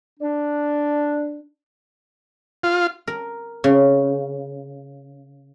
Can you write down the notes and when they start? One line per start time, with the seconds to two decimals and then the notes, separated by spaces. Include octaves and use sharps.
0.20 D4
2.63 F4
3.07 A#4
3.64 C#3